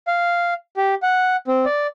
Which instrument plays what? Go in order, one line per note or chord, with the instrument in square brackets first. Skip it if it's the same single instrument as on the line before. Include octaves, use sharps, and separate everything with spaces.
[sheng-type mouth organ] F5
G4
F#5
C4
D5